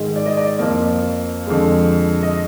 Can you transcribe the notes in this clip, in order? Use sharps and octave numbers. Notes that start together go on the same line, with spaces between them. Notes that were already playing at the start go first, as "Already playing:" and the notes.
Already playing: G#2 D#3 G#3
D5
D#5
D5
F2 F3 A#3
F2 D3 G#3
D#5